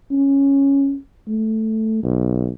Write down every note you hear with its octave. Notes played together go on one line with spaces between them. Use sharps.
C#4
A3
B1